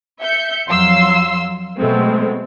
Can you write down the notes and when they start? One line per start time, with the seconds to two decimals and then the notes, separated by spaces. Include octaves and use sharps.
0.21 E5 G6 C#7
0.68 F2 F#3 F5 C6 E6 C7
1.79 B2 F#3 G#3 A3 C4